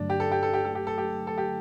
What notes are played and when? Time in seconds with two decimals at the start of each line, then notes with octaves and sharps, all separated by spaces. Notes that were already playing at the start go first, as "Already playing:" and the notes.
Already playing: G2 D3 F#3 A3 D4
0.10 G4
0.20 A4
0.32 G4
0.43 A4
0.54 G4
0.65 A4
0.75 G4
0.87 A4
0.98 G4
1.27 A4
1.38 G4